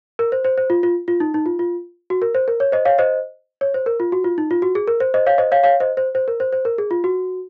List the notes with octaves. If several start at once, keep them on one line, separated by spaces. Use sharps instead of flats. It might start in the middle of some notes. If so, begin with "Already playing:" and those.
A#4
C5
C5
C5
F4
F4
F4
D#4
D#4
F4
F4
F#4
A#4
C5
A#4
C#5
C5 D#5
C#5 F5
C5 D#5
C#5
C5
A#4
F4
F#4
F4
D#4
F4
F#4
G#4
A#4
C5
C5 D#5
C#5 F5
C5 D#5
C#5 F5
C#5 F5
C5 D#5
C5
C5
A#4
C5
C5
A#4
G#4
F4
F#4